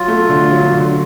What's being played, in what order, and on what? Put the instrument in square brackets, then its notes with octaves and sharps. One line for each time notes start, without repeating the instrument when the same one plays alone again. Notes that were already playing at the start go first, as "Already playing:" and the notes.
Already playing: [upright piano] F#3 [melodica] F4
[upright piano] A3
D3
F#3
D3